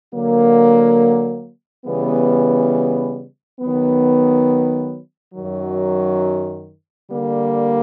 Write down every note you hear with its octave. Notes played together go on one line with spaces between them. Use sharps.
D3 F#3 A#3
C#3 E3 G3 B3
D#3 F#3 B3
F#2 D#3 F#3
D3 G3 A#3